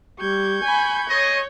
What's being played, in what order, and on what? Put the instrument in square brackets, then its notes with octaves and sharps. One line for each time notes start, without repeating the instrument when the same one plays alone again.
[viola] G3 [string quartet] C#6 G6 G#6
[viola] G#5 B5
[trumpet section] G#4 D#5 [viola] C#5